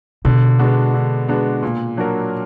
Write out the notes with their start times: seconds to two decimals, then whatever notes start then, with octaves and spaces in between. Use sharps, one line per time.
0.25 B2 D3
0.59 G#3 B3 D4 F#4
0.94 D3
1.28 G#3 B3 D4 F#4
1.63 A#2
1.97 F#3 D4 F#4 A#4